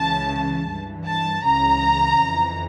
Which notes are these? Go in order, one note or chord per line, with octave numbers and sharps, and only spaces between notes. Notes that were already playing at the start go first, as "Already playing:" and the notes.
Already playing: C#2 C#3 E3 A5
G2 E3
A5
C#2 C#3 E3 A#5
F2 E3